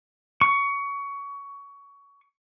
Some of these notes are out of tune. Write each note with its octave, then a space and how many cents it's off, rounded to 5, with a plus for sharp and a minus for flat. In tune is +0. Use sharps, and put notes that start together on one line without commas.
C#6 +20